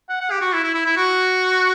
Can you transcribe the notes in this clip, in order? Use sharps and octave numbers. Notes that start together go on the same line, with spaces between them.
F#5
F#5
G4
F#4
E4
E4
E4
E4
F#4